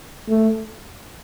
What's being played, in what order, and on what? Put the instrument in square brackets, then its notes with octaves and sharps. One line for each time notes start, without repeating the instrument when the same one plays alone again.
[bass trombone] A3